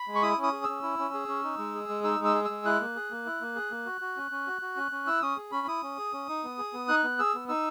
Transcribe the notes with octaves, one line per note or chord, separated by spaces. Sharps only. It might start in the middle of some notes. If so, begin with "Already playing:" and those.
Already playing: B5
G#3
C#6
E4 D#6
C#4 D#6
G#4
C#4 E6
E4
C#4
G#4
C#4
D#4
G#3
G#4
G#3
D#4 E6
G#3
E6
G#4
G#3 E6
E4 F#6
A#3
G#4
A#3
E4
A#3
G#4
A#3
F#4
F#4
C#4
C#4
F#4
F#4
C#4
C#4
E4 E6
C#4 D#6
G#4
C#4 B5
E4 D#6
C#4
G#4
C#4
D#4
B3
G#4
B3
D#4 F#6
B3
G#4 E6
B3
D#4 E6